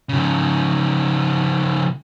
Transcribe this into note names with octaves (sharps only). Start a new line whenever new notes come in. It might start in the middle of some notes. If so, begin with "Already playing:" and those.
C#3 F3